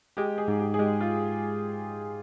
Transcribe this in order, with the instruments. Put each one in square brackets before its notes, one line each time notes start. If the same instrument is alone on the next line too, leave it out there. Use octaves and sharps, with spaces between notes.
[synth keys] G#3 [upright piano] G4
[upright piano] G#4
[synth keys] G#2
[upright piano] G4
G#4
[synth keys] G#3 [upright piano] G4
[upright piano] F4